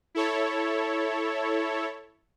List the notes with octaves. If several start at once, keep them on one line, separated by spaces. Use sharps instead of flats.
E4 A4 C#5